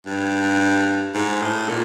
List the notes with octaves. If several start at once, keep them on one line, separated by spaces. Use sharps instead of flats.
G2
G#2
A2
A#2